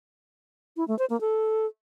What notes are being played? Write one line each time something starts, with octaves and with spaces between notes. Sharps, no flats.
E4
A3
C5
A#3
A4